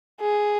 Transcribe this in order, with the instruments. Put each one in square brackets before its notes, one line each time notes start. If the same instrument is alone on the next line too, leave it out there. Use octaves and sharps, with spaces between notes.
[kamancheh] G#4